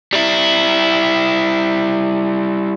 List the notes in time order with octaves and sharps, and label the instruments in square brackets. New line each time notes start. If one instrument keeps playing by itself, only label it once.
[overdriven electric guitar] G3 E4